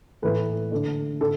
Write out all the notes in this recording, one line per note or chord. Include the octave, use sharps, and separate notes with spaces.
A2 E3 A3 E4 B4
D3 A3 D4
D3 A4